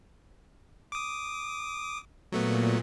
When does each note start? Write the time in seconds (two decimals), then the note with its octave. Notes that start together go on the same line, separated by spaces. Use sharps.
0.92 D6 D#6
2.32 A#2 F#3 A3 B3